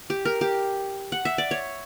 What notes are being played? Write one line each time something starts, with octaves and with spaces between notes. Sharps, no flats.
G4
A#4
G4
F#5
E5
D5
C#5